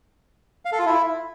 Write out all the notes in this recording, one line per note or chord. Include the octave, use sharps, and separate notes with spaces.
F5
A4
F4
E4